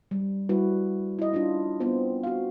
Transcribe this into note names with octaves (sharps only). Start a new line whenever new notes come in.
G3
G3 E4 F#4 B4
E4 D#5
C#4 D4 E4 F4
B3 C4 F4 C5
F#4 F5